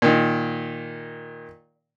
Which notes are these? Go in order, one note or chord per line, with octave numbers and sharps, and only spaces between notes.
A#2 D#3